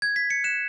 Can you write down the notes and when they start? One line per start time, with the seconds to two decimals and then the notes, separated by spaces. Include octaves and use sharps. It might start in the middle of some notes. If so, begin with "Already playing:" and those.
0.02 G#6
0.16 B6
0.30 C#7
0.44 F#6 E7